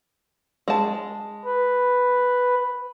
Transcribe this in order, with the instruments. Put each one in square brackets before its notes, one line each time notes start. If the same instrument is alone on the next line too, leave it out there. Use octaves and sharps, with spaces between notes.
[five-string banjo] G#3 A5
[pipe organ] B4